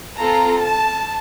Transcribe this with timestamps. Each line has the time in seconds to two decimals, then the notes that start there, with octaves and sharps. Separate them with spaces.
0.17 C4 F4 A4 A#5
0.61 A5